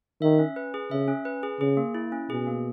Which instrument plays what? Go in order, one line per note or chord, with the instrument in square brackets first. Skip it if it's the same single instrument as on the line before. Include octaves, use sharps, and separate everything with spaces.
[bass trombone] D#3 [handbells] E5
[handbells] C#4
B4
G#4
[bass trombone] C#3 [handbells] E5
[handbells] C#4
B4
G#4
[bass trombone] C#3 [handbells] G#4
[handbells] A#3
E4
C#4
[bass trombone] B2 [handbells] G#4
[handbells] A#3